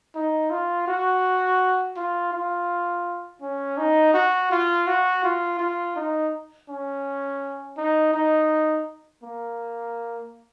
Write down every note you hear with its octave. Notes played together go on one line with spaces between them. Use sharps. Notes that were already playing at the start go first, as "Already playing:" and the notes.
D#4
F4
F#4
F4
F4
C#4
D#4
F#4
F4
F#4
F4
F4
D#4
C#4
D#4
D#4
A#3